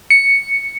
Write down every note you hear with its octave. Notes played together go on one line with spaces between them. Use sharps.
C#7